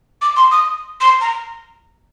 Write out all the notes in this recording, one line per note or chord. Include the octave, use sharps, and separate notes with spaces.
D6
C6
D#6
C6
A#5